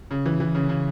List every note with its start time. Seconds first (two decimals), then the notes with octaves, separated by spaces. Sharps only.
0.11 C#3
0.26 E3
0.40 E3
0.55 C#3
0.69 C#3